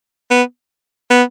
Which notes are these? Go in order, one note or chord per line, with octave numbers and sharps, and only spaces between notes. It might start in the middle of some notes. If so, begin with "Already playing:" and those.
B3
B3